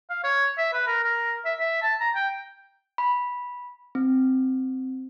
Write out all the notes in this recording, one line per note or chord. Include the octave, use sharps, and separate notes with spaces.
F5
C#5
E5
B4
A#4
A#4
E5
E5
A5
A#5
G5
B5
C4